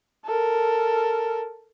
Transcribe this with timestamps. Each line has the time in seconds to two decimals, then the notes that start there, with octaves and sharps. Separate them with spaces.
0.25 A4 A#4